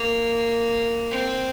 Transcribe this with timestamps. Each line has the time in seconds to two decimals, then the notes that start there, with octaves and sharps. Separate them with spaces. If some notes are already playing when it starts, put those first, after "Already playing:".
Already playing: A#3
1.11 C4